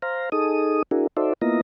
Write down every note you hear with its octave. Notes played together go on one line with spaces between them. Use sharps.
C5 F5 A#5
D#4 G#4 A4 D#6
D4 E4 F#4 G#4 A#4
D#4 F#4 A4 C5 D5 E5
A#3 B3 E4 F4 D#5 A#5